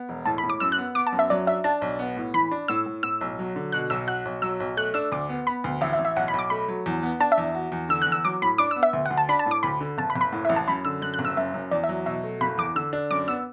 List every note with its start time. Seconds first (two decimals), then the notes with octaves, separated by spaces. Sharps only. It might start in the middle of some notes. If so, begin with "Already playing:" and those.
Already playing: B3
0.09 E1
0.25 A2 A5
0.38 B5
0.44 A2
0.50 D6
0.60 F#2 E6
0.72 F#6
0.78 B3
0.95 B3 D6
1.07 A5
1.12 F#2
1.19 E5
1.30 F#3 D5
1.47 D4 E5
1.64 D4 A5
1.82 B1
1.99 B3
2.17 A2
2.34 E3 B5
2.52 D4
2.68 A2 E6
2.86 A2
3.03 A2 E6
3.21 B1
3.39 F#3
3.56 D3
3.72 B2 F#6
3.90 B1 E6
4.07 F#4 F#6
4.25 B1
4.42 F#3 E6
4.60 B1
4.77 A3 F#6
4.94 D4 E6
5.12 D2 D6
5.29 B3
5.47 B3 B5
5.64 D2
5.81 A1 E5
5.93 E5
5.99 A1
6.05 E5
6.16 B1 F#5
6.28 B5
6.34 B1
6.39 D6
6.50 A3 B5
6.68 F#3
6.86 E2
7.03 B3
7.20 D4 A5
7.32 E5
7.38 E2
7.55 F#4
7.72 E2
7.89 D3 E6
8.02 F#6
8.07 E2
8.12 E6
8.25 F#3 D6
8.42 A2 B5
8.58 D4 D6
8.71 E6
8.76 B3
8.83 E5
8.93 D2
9.06 F#5
9.11 D2
9.17 A5
9.29 D4 B5
9.39 A5
9.46 A2
9.51 D6
9.63 D2 B5
9.81 D3
9.98 F#1 A5
10.10 B5
10.16 F#1
10.21 B5
10.32 A2
10.45 E5
10.49 A1
10.56 A5
10.68 F#2 B5
10.85 D3 E6
11.01 F#2 F#6
11.14 F#6
11.19 F#1
11.25 E6
11.37 F#2 E5
11.54 F#2
11.71 E2 D5
11.84 E5
11.89 F#3
12.06 B2 E5
12.24 A3
12.41 F#1 B5
12.58 E2 D6
12.76 D3 E6
12.93 D4
13.11 F#2 D6
13.28 B3 E6